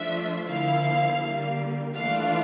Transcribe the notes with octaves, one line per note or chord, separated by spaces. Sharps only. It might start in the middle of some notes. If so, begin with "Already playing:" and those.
Already playing: F3 A3 D4 F4 E5
D3 F3 A#3 E4 F5
D3 G3 A#3
E3 A3 D4 F4 F5